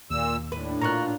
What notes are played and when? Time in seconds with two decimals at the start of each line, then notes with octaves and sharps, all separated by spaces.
0.10 D#2 A#2 E6
0.52 A2 D4 B4
0.82 A#2 F4 A#5 C#6 F#6